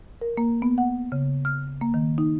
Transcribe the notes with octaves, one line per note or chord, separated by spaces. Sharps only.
A#4
A#3
B3
F#5
C#3
F6
A#3
D#3
D#4